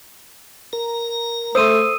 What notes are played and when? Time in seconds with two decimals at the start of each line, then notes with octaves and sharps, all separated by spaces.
0.73 A#4 A#5
1.55 A3 C5 C6 D#6 E6 D#7